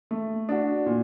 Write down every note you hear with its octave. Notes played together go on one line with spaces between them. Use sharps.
A3
D4 F#4
A#2